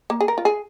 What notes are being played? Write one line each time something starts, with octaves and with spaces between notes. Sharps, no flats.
A#3
G#4
A#4
F4
G#4